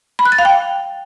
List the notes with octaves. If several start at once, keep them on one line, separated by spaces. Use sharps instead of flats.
B5
F#6
A6
F5
G5